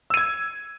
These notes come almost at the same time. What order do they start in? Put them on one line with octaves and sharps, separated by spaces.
E6 D#7 G#6